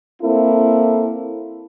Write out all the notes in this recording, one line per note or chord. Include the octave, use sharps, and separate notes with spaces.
A#3 C4 E4 A4